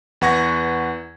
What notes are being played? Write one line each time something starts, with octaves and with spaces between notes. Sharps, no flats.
E2 B4 F#5 C#6 G#6 A#6